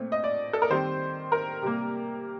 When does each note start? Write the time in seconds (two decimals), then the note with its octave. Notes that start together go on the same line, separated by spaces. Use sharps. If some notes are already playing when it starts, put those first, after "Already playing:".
Already playing: A#2 A3 C4
0.12 D#5
0.24 D5
0.53 A4
0.62 A#4
0.70 D#3 G3 C4 C5
1.32 A#4
1.62 C3 G3 A#3